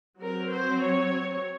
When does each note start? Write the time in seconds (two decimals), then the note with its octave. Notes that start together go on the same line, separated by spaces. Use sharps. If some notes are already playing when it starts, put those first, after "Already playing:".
0.20 F#3 C4 A#4
0.51 C5
0.82 C#5